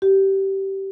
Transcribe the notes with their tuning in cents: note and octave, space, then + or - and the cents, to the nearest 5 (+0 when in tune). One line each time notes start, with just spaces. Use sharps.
G4 -20